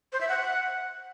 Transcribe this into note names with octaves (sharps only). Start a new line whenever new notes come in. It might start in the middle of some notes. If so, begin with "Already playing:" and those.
C5
E5
F#5